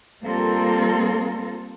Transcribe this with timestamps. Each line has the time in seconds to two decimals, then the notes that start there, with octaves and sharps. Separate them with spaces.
0.22 G3 A#3 C4 F4 A4 A#4